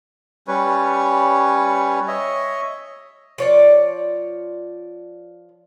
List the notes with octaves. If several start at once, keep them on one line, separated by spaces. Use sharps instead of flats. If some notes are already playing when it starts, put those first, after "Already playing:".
G3 C#4 B4 C#5
C#5 D#5 E5
F3 C#5 D5